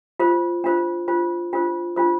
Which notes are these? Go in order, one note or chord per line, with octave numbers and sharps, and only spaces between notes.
F4 C5
D4 F4 C5
D4 F4 C5
D4 F4 C5
D4 F4 C5